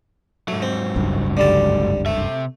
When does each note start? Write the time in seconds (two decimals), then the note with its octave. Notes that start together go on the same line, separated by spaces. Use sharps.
0.48 G#2 F#3 A3
0.62 C4
0.96 F#1 C#2 G2
1.37 D3 G3 A5
2.06 C3 A3 E5